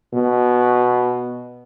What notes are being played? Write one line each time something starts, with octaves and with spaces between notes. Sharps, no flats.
B2